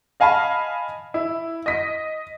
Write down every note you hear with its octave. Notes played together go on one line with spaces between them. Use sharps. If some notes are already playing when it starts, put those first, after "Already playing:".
D#5 F5 G#5 A5 B5
E4
D#5 B6